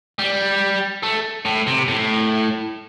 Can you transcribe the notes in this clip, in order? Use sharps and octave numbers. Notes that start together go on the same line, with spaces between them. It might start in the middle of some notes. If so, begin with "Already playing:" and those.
G3
A3
A2
C3
A2